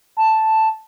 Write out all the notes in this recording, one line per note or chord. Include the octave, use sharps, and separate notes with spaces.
A5